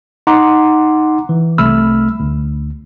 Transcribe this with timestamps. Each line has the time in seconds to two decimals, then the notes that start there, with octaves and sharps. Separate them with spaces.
0.27 D#4 F#5 A#5 C6 D6
1.29 E3
1.58 C2 A3 B5 E6 F6
2.20 D2